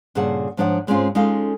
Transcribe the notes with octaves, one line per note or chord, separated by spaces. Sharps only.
G2 A#2 C#3 G#4 F#5 A5
G#2 F3 D4 C#5 F#5
G#2 G#3 C4 C#4 F4
G#3 C#4 D#4 F4 A4 F5